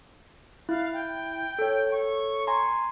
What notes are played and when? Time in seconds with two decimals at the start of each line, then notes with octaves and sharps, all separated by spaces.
0.69 E4 F5
0.94 G5
1.59 A4 C#5
1.91 C#6
2.47 G#5 A#5 C6